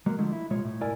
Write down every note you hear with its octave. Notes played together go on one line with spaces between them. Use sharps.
F#3 G#3 A#3
D3 F3 G#3 A3
E4
C2 A#2 G#3 F4 C#5
A2
B1 F#2 E4 A#4 D5 G#5